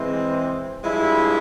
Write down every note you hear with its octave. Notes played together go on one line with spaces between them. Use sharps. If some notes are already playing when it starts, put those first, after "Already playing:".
Already playing: E3 G#3 C4
G2 F3 G#3 E4